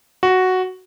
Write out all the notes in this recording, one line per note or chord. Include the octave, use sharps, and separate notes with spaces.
F#4